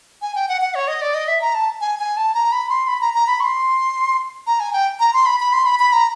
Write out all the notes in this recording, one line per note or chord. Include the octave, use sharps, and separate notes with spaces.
G#5
G5
F#5
F#5
C#5
D#5
D5
D#5
E5
A#5
A5
G#5
G#5
A5
A#5
B5
C6
B5
A#5
A#5
B5
C#6
C6
A#5
G#5
G5
A#5
C6
B5
B5
C6
B5
B5
A#5